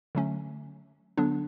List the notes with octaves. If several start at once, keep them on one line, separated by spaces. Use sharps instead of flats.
D3 F#3 A3 C#4
D3 F#3 B3 D4